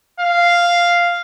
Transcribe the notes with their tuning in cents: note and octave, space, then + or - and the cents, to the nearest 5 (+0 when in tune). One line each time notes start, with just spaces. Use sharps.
F5 -5